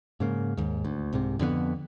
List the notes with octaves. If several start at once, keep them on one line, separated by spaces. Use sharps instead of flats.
G#2 C#3 A#3
D#2 G#2
D2
C2 G#2 C3
F2 D3 D#3 B3